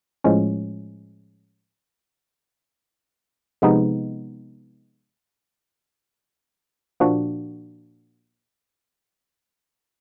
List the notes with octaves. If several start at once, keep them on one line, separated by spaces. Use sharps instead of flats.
A2 F3 G#3 C#4
C3 F3 G#3 B3 D#4
A#2 F3 A#3 D4 F#4